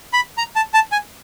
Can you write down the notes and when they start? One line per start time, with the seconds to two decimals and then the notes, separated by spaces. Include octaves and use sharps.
0.13 B5
0.38 A#5
0.56 A5
0.74 A5
0.92 G#5